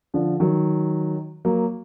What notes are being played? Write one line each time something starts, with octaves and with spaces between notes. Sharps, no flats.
D3 F3
D#3 F#3
F#3 A#3